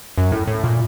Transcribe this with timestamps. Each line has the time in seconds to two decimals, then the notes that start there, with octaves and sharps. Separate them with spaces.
0.18 F#2
0.32 A2
0.47 A2
0.64 A#2